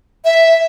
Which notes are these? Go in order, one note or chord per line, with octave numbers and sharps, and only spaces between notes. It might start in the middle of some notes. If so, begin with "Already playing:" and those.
E5